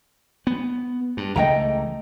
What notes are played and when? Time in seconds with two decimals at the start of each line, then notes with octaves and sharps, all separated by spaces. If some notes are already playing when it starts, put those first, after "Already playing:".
0.47 B3
1.17 G2
1.36 C#2 E3 A3 D#5 G5 A#5